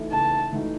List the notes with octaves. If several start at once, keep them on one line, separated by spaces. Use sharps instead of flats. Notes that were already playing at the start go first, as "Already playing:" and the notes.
Already playing: E3 A3 D#4 F#4
C#3 A5
E3 A3 D#4 F#4